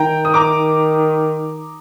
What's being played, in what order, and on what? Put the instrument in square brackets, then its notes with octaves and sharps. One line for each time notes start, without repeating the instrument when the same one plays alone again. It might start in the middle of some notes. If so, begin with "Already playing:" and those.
Already playing: [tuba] D#3 [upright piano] G5 A#5
[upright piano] D#6
A#5 D6